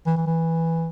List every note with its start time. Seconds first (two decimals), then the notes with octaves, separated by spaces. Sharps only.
0.06 E3
0.17 E3
0.27 E3